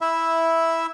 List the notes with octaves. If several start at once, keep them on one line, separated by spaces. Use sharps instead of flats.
E4 E5